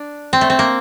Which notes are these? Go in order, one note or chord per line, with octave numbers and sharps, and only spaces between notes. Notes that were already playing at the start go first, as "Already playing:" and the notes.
Already playing: D4
C4
A3
C4
A#3